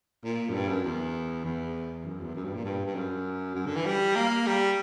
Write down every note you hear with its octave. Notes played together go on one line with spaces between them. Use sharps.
A#2
F#2
G2
F#2
E2
E2
F#2
E2
F#2
G2
A#2
G2
G2
F#2
F#2
D3
E3
G3
A#3
G3